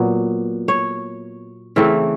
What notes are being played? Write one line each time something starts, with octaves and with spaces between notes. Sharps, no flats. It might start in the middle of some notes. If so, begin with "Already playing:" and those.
Already playing: A#2 F#3 B3
C#5
C#3 E3 A3 C4